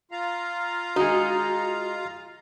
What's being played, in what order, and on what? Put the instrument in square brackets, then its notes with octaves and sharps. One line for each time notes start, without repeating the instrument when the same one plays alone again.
[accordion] F4 F5 A#5
[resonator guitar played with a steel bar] G#3 D#4 [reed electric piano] F#4